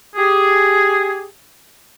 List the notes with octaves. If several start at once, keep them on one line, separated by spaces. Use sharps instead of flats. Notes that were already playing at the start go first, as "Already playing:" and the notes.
G4 G#4